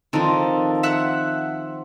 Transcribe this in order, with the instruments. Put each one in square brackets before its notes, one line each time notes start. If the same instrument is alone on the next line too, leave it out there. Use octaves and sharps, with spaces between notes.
[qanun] D#3 F3 [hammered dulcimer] C4 [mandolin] D4 A4 A#4
[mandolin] E5 F#5 F#6